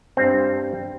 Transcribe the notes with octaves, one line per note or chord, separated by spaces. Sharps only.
G2 G3 C4